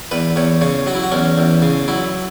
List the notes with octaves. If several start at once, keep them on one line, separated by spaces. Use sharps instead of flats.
E2 B4
E2 C#5
C#3 C#5
F#3 F#4
E4
F#4
E2 C#4
E2
C#3
F#3 E4